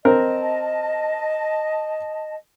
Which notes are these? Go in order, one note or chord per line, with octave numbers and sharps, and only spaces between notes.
C4 A#4 D#5 A5